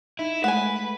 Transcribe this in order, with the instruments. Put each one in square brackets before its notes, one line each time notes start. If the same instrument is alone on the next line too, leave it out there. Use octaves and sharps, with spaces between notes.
[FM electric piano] D#4 [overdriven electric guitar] E4
[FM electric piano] G#3 A3 [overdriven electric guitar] B4 [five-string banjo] F#5 G#5